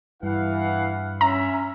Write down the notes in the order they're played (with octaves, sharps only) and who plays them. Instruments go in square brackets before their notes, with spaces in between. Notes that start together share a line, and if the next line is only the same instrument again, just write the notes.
[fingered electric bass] G2 [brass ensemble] E3 F5 F#5
[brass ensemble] C#4 E5 [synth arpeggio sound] A#5